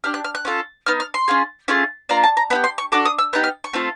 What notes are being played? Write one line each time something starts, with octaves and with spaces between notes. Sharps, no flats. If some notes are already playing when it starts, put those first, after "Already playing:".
D4 G4 F6
F#6
F6
F#6
C#4 F4 A4
B3 D#4 F6
F6
C6
C#4 F4 G#4
A3 C#4 F4 G#4
A#3 D4 F4 A#5
A5
A#5
B3 E4 G4 B5
C6
C#6
D4 F#4 A4 D6
D#6
E6
B3 D#4 G4 F#6
F6
C#6
A3 C4 F4 A4